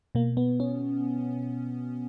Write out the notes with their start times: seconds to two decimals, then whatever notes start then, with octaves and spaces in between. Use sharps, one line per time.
0.15 B2 A#3
0.37 B3
0.60 C#4